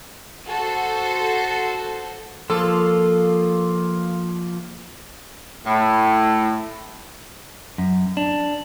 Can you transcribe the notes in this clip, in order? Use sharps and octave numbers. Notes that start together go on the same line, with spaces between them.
F#4 A4 C5
F3 A#3 F4 A4
A2
F#2
D4